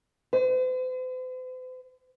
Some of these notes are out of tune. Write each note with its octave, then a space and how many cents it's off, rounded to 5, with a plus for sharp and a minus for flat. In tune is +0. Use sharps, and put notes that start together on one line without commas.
C5 -45